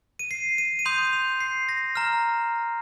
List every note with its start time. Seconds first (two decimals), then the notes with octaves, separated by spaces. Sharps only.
0.19 D#7
0.31 C7
0.58 D#7
0.79 D#7
0.85 C6 D#6 G6 F7
1.13 F7
1.40 C7
1.69 A#6
1.95 A#5 F6